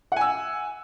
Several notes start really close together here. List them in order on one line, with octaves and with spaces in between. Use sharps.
F#5 G#5 E6